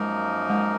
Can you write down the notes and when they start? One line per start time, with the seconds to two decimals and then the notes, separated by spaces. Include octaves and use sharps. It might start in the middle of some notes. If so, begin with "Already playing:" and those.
Already playing: F#2 F3 G#3 A#3 D#4 A#4
0.50 G#3